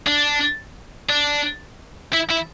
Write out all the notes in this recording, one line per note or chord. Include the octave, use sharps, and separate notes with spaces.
D4
D4
E4
E4